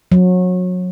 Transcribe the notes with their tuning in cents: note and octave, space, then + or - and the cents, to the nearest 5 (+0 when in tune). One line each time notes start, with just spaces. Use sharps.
F#3 -30